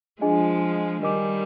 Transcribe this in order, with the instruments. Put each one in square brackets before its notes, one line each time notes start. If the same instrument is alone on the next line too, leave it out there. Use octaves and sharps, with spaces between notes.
[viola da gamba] F3 G#3 [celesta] D4 F4 G#4 D#5 G#5
[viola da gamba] D#3 G3 [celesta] A#4 D#5 G#5 D6